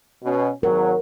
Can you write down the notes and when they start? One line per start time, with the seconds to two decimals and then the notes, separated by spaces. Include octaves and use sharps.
0.24 B2 C#4
0.63 G#1 F#3 A#4